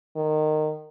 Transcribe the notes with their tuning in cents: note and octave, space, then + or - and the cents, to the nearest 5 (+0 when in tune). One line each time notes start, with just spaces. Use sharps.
D#3 -20